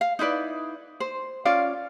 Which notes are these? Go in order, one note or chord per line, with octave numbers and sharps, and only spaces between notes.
F5
D#4 E4 B4 D5
C5
C#4 F4 D5 F5